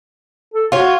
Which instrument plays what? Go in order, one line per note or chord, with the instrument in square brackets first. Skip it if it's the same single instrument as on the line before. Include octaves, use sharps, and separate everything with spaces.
[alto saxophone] A4
[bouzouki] F4 C#5 [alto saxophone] F#4